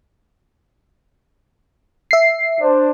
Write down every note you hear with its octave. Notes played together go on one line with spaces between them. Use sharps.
E5 C7
D4 C5